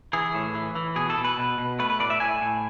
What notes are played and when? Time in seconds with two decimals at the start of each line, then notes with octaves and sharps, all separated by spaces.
0.13 E3 G#4
0.35 A2
0.55 E3
0.75 E3
0.96 B2 G#4
1.10 A4
1.18 B2
1.25 B4
1.38 B2
1.58 B2
1.79 A3 B4
1.90 B4
2.00 A2 D5
2.10 E5
2.20 A2 G#5
2.41 A2